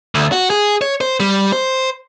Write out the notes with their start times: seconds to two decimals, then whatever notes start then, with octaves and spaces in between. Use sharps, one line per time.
0.15 D2
0.32 F#4
0.50 G#4
0.82 C#5
1.01 C5
1.20 G3
1.52 C5